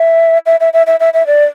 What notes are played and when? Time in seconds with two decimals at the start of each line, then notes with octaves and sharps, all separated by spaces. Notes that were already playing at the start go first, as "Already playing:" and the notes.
Already playing: E5
0.46 E5
0.60 E5
0.73 E5
0.87 E5
1.00 E5
1.14 E5
1.27 D5